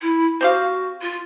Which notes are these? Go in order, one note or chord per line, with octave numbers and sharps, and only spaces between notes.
E4
C4 F#4 G4 F5
F4